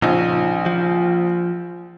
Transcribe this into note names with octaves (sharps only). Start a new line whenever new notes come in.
A#1 A#2 C#3 D#4
F3